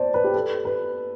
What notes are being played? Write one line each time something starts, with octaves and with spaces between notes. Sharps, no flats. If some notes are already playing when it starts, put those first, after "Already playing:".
Already playing: C5 D5 A5
B4
G4
A4
B4